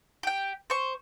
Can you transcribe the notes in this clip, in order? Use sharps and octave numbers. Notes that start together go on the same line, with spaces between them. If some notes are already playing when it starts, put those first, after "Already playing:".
G4 G5
C5 C#6